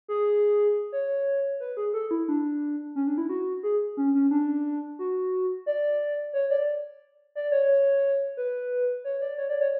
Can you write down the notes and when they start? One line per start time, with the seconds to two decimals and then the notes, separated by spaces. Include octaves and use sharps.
0.08 G#4
0.92 C#5
1.60 B4
1.77 G#4
1.94 A4
2.11 E4
2.28 D4
2.95 C#4
3.07 D4
3.18 E4
3.29 F#4
3.63 G#4
3.97 C#4
4.15 C#4
4.31 D4
4.99 F#4
5.66 D5
6.33 C#5
6.50 D5
7.35 D5
7.52 C#5
8.37 B4
9.05 C#5
9.22 D5
9.38 C#5
9.49 D5
9.61 C#5